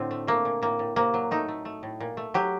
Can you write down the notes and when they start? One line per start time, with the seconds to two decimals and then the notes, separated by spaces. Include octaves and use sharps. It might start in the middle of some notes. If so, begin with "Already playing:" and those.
Already playing: A2 D3 C4 D4
0.11 A3
0.27 A3 A#3
0.45 A#2
0.62 A2 A#3
0.79 A2
0.96 C3 A#3
1.14 F#3
1.31 A3 D#4
1.48 A3
1.65 A3
1.83 A2
2.00 A#2
2.17 A3
2.34 F#3 G4